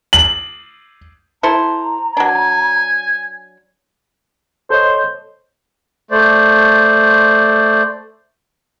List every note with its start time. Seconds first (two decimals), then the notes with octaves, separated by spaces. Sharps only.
0.13 F#7
1.43 E4 A4 C5 A#5
2.17 F#3 D4 G#5
4.70 A4 C5 C#5 D#5
6.11 A3 C5 D5